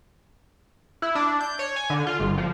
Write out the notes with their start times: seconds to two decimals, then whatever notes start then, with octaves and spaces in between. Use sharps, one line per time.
1.02 E4
1.15 D4
1.40 G6
1.59 C#5
1.76 G#5
1.90 D3
2.07 F4
2.20 G1
2.38 F3